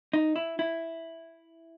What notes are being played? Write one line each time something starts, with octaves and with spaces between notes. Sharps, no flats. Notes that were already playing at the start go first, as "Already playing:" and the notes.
D#4
E4
E4